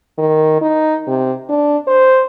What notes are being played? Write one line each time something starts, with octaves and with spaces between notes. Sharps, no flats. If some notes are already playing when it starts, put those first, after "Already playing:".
D#3
D#4
C3
D4
C5